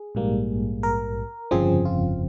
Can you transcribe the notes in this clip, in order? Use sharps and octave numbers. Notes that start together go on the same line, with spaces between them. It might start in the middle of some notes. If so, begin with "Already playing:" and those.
Already playing: G#4
A#1 G#2 G3 A#3
A#4
G1 F2 C#3 F3 C4 G#4
F4